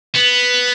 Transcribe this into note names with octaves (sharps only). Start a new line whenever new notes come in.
B3